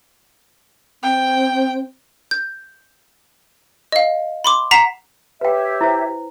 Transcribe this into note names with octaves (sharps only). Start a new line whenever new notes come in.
C4 G5
G6
D#5 F5
B5 C6 D6
F#5 A#5 B6 C7 E7 F7
G4 B4 C#5 E5 G5
E4 C5